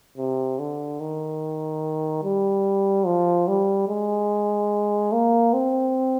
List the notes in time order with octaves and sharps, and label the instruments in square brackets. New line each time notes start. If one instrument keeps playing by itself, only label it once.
[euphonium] C3
D3
D#3
G3
F3
G3
G#3
A#3
C4